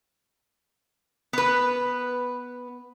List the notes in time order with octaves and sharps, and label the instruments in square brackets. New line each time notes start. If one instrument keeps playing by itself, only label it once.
[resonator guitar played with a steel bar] B3 B4